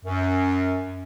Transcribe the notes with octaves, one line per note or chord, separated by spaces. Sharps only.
F#2